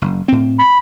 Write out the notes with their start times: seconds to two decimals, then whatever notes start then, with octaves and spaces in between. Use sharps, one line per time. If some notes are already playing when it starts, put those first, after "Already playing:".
0.02 F#1
0.28 A2 C4
0.59 B5